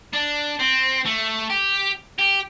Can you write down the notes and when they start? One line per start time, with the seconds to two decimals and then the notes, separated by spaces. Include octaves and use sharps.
0.14 D4
0.59 C4
1.05 A3
1.50 G4
2.19 G4